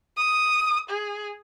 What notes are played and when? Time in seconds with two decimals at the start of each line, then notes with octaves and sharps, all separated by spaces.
0.17 D#6
0.90 G#4